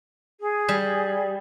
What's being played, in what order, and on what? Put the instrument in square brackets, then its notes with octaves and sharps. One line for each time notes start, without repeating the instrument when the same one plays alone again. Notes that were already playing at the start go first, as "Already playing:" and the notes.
[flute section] G#4
[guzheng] G3